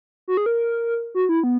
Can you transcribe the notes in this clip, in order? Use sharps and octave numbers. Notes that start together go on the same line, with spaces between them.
F#4
G#4
A#4
F#4
E4
B3